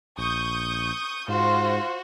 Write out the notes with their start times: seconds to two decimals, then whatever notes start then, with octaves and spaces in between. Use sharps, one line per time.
0.18 A#1 C#6 D#6 G6
1.28 G#2 F4 F#4 C5